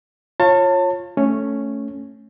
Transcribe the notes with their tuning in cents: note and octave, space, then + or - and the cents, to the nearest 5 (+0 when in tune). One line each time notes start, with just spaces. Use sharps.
F4 +0 C#5 -20 A5 +30
A3 +0 C#4 +0